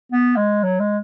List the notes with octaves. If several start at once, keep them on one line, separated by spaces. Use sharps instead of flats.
B3
G#3
F#3
G#3